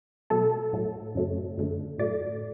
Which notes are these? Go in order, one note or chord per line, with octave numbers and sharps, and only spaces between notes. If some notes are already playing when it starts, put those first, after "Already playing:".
B2 F#3 A3 A4
A2 F#3 A3
F#2 C#3 F#3 A3
F#2 D3 A3
A2 F#3 A3 D5